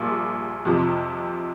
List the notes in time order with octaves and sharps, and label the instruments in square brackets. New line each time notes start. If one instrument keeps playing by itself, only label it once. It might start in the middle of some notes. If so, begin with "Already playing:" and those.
Already playing: [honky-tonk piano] A#1 A#2 G3 F4
F2 C3 F3